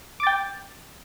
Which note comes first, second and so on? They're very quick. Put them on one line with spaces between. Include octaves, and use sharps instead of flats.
D6 A6 G5